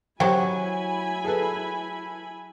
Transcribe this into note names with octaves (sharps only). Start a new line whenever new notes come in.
F#3 E4 G4 C5 G5 G#5 B5
G#4 A4 B4